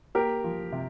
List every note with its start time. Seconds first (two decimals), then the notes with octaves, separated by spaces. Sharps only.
0.15 A#3 G4 A#4
0.44 F3
0.72 C3